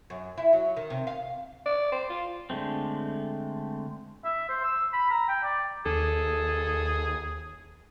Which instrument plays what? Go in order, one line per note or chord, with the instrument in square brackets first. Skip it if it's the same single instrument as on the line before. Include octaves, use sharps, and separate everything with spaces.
[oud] F#2
E4
F#3
D#3
C3
F5
[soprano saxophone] D5
C5
F4
[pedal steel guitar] D3 G#3 A3 C4
[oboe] E5
C5
E6
B5
A#5
G5
D5
[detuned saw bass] D#2 [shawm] G#4 [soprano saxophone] A4